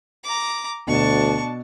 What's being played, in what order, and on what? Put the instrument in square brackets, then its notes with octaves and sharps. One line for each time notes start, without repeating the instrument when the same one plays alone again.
[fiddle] A#5 D6
[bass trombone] D2 [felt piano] B2 [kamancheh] D4 A5 [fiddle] C#6